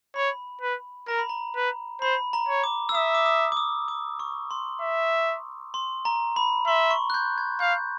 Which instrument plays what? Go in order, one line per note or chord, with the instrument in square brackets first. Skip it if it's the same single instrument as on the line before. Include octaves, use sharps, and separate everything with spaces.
[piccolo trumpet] C#5 [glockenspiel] B5
[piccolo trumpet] B4
[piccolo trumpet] A#4 [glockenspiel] A#5
[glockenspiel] B5
A#5
[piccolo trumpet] B4
[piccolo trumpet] C5 [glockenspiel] B5
[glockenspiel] A#5
[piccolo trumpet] C#5
[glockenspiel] D6
E6
[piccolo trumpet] E5 [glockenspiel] D#6
[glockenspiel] D6
D#6
D6
D#6
D6
C#6
C6
[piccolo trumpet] E5
[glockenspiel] C6
A#5
B5
[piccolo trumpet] E5 [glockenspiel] C6
[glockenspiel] C#6
F#6
G6
G#6
[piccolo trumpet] F5 [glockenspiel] G6